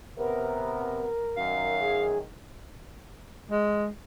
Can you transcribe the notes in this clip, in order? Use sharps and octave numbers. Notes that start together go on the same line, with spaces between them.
C3 B3 A#4
F#2 D#3 F5
G#4
G#3